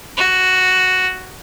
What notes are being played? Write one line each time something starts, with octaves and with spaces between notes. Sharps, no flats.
F#4